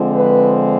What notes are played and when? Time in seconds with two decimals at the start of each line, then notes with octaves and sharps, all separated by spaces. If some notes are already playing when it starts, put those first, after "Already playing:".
Already playing: D3 F3 G#3 C4
0.15 B4